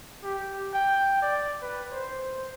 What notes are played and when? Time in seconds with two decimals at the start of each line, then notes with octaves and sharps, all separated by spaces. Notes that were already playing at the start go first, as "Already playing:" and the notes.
0.23 G4
0.74 G5
1.22 D5
1.62 B4
1.91 C5